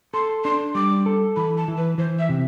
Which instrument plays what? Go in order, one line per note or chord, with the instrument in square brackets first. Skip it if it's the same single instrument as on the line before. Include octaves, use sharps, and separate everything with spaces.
[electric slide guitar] A4 [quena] C6
[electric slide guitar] D4 [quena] C6
[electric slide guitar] G3 [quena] D6
[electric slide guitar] A4
[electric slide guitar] E3 [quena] B5
[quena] A5
[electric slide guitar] E3
[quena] B4
[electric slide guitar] E3 [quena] C5
[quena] E5
[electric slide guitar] C3